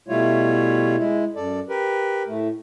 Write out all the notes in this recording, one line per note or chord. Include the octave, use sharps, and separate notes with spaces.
B2 G3 A3 E4 F4 C#5
G#3 E4
F#2 A4 D5
G4 A#4 B4
A2 A3